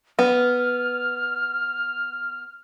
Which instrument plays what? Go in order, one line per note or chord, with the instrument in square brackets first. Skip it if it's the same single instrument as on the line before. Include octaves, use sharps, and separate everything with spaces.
[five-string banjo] B3 [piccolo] F6